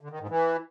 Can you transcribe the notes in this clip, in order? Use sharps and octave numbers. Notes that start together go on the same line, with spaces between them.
D3
D#3
G#2
E3